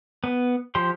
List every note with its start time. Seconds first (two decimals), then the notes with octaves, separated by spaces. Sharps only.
0.24 B3
0.75 F3 G4 C6